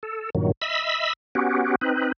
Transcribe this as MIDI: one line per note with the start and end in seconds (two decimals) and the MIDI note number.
0.03 0.30 69
0.35 0.52 43
0.35 0.52 46
0.35 0.52 51
0.35 0.52 54
0.62 1.13 75
0.62 1.13 76
0.62 1.13 83
0.62 1.13 88
1.35 1.75 59
1.35 1.75 61
1.35 1.75 66
1.35 1.75 67
1.81 2.12 60
1.81 2.12 63
1.81 2.12 71